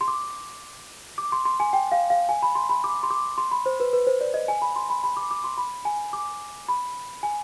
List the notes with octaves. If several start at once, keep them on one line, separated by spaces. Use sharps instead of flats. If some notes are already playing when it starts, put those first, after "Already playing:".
C6
D6
D6
C6
C6
G#5
G5
F5
F5
G#5
B5
C6
B5
D6
C6
D6
C6
B5
C5
B4
B4
C5
D5
D#5
G#5
B5
C6
B5
B5
D6
D6
C6
B5
G#5
D6
B5
G#5